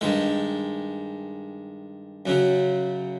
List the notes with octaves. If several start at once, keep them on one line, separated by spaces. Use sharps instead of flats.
G2 D#3 G#3
F#2 C#3 F#3